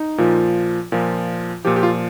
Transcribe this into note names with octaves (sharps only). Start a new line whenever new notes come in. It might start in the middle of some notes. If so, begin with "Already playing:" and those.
Already playing: D#4
A#2 F3
A#2 F3
A#2 F3 G4
G4
F4